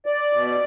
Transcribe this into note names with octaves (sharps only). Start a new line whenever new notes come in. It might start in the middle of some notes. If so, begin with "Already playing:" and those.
D5
B2